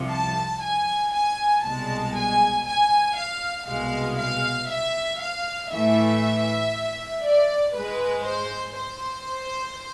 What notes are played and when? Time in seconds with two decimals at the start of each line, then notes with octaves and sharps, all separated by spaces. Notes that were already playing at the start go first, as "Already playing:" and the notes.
Already playing: C2 C3 F3
0.10 A5
0.61 G#5
1.12 G#5
1.63 C2 B2 G#3 A5
2.15 G#5
2.66 G#5
3.16 F5
3.66 C2 B2 G#3 F5
4.17 F5
4.69 E5
5.20 F5
5.70 A2 E3 A3 E5
7.23 D5
7.74 G#2 G#3 B4
8.25 C5
8.76 C5